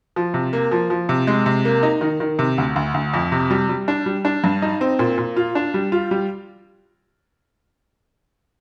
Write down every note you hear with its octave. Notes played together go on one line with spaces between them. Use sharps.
F3
C3
A#3
F3
F3
C3
G#3
C3
A#3
D#4
D#3
D#3
C3
D2
D2
D2
F2
C3
G3
G3
D4
G3
D4
G2
D#4
C4
A#2
A#2
F4
D4
G3
F4
G3